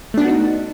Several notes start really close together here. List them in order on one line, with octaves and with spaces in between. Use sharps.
A3 D4 B3 F#4 D#4